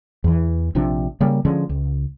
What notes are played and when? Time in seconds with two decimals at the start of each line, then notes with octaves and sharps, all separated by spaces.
0.24 E2 E3
0.75 A#1 C3 F3 D4
1.21 C#3 G3 A#3
1.45 D3 F3 G#3 C#4
1.69 C#2